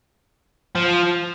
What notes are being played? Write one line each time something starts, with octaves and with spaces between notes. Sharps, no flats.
F3